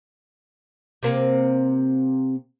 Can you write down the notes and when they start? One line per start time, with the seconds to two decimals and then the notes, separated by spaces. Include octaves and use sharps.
1.03 C3 A#3 C4